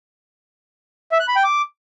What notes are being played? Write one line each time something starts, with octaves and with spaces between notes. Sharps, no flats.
E5
F#6
B5
G5
D6